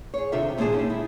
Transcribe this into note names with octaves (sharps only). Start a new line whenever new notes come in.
G#4 C#5
C3 D#3 D4 F4 A4 E5
D#2 A#2 G#3 D4 G#4 A5
E2 G#3 A#3 C#4 D#4 G4
E4